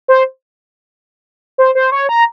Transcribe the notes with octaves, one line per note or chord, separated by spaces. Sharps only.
C5
C5
C5
C#5
A#5